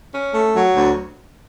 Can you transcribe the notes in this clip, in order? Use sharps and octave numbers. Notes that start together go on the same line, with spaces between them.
C#4
A3
F#3
D2